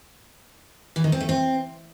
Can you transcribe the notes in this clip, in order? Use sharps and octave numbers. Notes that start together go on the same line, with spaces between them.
E3
D#3
C4
A3
C4